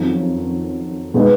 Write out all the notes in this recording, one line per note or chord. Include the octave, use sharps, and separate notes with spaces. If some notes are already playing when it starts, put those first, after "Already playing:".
Already playing: F2 D#3 F#3 C#4 F4
B2 G#3 B3 D#4